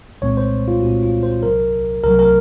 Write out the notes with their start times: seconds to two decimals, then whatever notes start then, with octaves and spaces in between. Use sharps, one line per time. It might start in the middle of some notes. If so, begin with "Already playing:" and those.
0.22 C2 A#2 G#3 C4 C#5
0.37 C5
0.68 F4
0.82 C2 A#2 G#3 C4 F#4
1.03 F4
1.23 C5
1.43 C2 C3 F#3 A#4
2.04 C2 C3 F#3 A#4
2.19 A#4